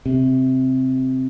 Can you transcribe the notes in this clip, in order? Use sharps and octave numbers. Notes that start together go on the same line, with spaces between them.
C3